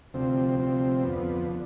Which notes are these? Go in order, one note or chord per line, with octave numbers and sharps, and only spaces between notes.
D2 C3 F3 C4
D2 C3 F3 C4
F2 D3 F3 B3
D3